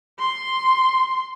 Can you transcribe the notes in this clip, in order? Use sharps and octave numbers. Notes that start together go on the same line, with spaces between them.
C6